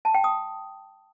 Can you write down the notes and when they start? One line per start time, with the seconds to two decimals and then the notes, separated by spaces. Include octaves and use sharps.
0.05 A5
0.14 G5
0.24 D#6